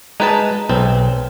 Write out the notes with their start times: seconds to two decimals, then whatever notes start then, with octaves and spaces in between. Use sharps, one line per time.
0.20 G#3 D#4 B4 A5
0.69 B1 C4